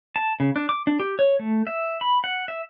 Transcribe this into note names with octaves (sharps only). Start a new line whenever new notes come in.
A5
C#3
D4
D6
D4
G4
C#5
A3
E5
B5
F#5
E5